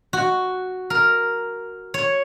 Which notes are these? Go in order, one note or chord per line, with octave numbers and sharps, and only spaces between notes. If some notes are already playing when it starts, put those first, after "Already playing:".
F#4
A#4
C#5